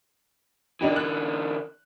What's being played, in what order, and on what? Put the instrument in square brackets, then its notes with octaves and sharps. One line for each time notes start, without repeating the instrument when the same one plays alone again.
[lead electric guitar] D3 E3 [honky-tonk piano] D4 D#4 G4
[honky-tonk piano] F#6